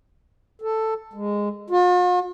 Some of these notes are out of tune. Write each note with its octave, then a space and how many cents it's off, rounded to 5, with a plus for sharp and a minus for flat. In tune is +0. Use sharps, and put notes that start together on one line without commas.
A4 +5
G#3 -15
F4 +45